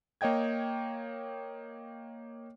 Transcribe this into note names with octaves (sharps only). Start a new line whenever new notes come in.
A#3 C#5 D#5 G5 G#6